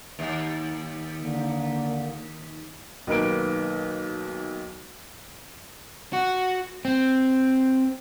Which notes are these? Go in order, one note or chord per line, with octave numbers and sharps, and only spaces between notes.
D#2
D3 A#3
B1 D#3 A#3 B4 D7
F#4
C4